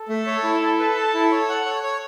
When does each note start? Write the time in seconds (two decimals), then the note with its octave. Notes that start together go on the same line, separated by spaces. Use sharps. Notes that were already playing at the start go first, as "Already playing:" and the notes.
Already playing: A4
0.09 A3
0.26 C#5
0.43 E4
0.61 E4
0.79 B4
0.96 A5
1.14 E4
1.31 C#5
1.49 F#5
1.66 C#5
1.84 C#5